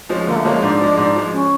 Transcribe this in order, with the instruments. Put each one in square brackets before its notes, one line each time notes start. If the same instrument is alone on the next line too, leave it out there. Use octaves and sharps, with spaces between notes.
[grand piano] F3 G#3 C#4
[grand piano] D3 [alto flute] A#3
[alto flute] A3
[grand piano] F3 G#3 C#4 [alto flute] A#3
[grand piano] G#2 [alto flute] D4
[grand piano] F3 G#3
G#2
F3 G#3
[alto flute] C#4